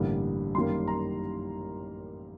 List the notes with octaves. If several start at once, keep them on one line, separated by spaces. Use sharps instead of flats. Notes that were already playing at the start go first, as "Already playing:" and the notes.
Already playing: A1 G2 D3 G3 A#3
F#2 D#3 G3 A#3 C6
A#5